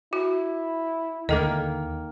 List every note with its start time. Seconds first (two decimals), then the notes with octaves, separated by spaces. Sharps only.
0.13 E4 F#4
1.29 D#2 D3 D#3 A#3 A4 D#5